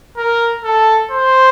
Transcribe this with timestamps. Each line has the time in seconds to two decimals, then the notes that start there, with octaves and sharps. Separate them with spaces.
0.17 A#4
0.64 A4
1.11 C5